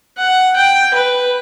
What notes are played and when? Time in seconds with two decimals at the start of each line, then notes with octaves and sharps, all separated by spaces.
0.18 F#5
0.56 G5
0.94 B4